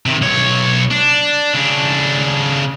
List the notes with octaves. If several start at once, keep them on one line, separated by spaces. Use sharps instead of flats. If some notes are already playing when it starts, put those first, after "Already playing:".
C3 D#3
B1 C#5
D4
C#3 D4